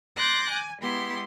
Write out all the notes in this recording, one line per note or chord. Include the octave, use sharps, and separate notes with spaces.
C6 D6 F#6 G6 A6 A#6
G#5
G#3 B3 E4 G4 C6